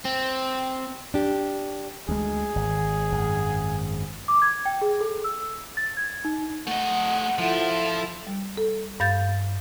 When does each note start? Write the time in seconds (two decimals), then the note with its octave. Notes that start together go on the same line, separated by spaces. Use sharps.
0.05 C4
1.14 D4 G4
2.09 D2 G#3 G#4
2.56 G#1
3.12 G#1 F#2
4.28 D6
4.42 G#6
4.66 G5
4.82 G#4
5.01 A4
5.24 E6
5.77 A6
5.97 G#6
6.25 D#4
6.67 A3 D#5 F#5
7.39 F3 E4 F4 A4
8.27 G3
8.57 A4
9.00 G2 F5 G6 A6